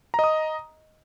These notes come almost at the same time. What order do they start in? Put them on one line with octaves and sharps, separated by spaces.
A#5 D#5 D#6